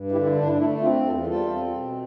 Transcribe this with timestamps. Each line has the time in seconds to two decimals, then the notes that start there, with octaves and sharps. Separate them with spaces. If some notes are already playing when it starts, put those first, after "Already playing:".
Already playing: G2
0.12 D3 E4 G4
0.23 E4
0.35 D4
0.46 E4
0.52 D4
0.58 A3 E4
0.81 C4 D4 F4
1.04 E2 F4 A4
1.27 G3 F4 A4
1.50 C4
1.72 B2